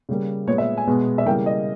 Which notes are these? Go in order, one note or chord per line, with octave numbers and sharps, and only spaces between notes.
C#3 G3 A#3
A#2 G#3 B3 C#5
E5
G#5
B2 G#3 B3
E5
C#3 E3 G3 A#3 G5
D#5